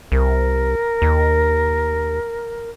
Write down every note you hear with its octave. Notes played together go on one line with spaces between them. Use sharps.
C2 A#4
D#2